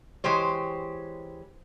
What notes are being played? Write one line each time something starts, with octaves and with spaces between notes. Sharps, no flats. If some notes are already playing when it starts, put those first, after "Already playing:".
E3 G#3 G4 C5 C#5